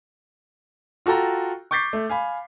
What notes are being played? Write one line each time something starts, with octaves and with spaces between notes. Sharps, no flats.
F4 F#4 A4 G5 A#5
C#6 D6 G6 A6 B6 C7
A3
F5 G#5 B5